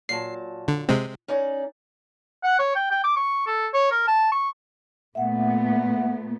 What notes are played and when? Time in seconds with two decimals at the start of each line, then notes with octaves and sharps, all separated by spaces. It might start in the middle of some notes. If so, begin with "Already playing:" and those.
0.09 A#2 F#3 A5 C7
0.68 D3
0.89 C3 G#3 C4
1.28 C#4 D#4 D5
2.44 F#5
2.59 C#5
2.76 G5
2.91 G5
3.04 D6
3.17 C#6
3.47 A4
3.74 C#5
3.92 A#4
4.07 A5
4.32 C#6
5.15 A#2 A3 B3 E5 F#5